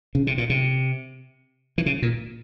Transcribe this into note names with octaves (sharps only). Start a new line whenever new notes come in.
C#3
C3
A#2
C3
E3
C#3
A#2